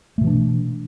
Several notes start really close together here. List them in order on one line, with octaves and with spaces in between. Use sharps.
A3 B2 E3 D4